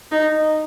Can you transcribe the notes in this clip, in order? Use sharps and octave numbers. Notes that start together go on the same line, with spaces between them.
D#4